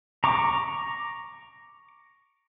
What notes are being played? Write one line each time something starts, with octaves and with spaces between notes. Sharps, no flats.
A#5 C#6 D6